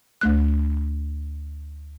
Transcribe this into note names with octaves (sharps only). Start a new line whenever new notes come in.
D2 A3 F#6